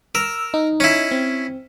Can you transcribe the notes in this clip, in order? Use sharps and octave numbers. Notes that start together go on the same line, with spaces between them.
A#4 E6
D#4
C#4 E4
C4